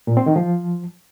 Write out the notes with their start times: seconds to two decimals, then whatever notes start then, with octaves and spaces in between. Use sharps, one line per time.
0.07 A#2
0.17 C4
0.26 D#3
0.36 F3